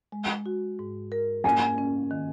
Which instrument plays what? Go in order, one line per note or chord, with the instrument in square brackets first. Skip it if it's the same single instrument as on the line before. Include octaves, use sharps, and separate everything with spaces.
[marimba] G#3
F#4
G#2
A#4
[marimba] A#3 [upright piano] G#5
[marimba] C#4
D#3